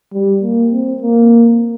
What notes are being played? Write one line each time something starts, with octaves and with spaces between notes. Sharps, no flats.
G3
A#3
C4
A#3